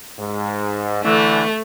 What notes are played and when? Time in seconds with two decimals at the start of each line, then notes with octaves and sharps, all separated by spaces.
0.18 G#2
1.04 D3 E3 A3